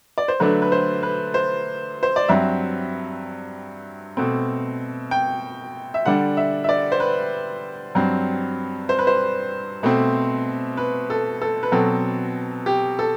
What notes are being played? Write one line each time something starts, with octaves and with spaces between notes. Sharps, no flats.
D5
C5
D3 F#3 A3 D4 B4
B4
C5
B4
C5
C5
D5
G2 F#3 C4 E5
B2 A3 C4
G5
E5
D3 G3 D4 F#5
E5
E5
D5
C5
B4
G2 F#3 C4
C5
B4
C5
B2 A3 C4
B4
A4
A4
B4
B2 F#3 C4 A4
G4
A4